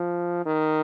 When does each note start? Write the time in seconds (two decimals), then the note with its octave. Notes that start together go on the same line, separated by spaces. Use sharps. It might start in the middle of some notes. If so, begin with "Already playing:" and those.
Already playing: F3
0.46 D#3